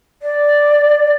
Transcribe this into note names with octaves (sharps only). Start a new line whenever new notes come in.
D5